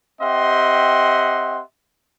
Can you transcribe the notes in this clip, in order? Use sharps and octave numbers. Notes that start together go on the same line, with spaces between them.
C4 G4 D#5 E5 F#5 C6